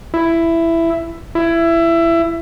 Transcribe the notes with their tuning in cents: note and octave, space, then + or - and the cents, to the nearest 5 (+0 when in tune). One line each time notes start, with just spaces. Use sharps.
E4 +10
E4 +20